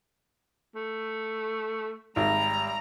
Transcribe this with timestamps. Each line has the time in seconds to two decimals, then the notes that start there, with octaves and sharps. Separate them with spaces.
0.75 A3
2.16 G#1 G3 A#5